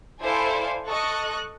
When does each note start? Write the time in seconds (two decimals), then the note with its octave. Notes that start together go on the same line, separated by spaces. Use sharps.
0.21 E4 A4 C5 D5 F5 G#5
0.86 A4 D#5 C#6 F#6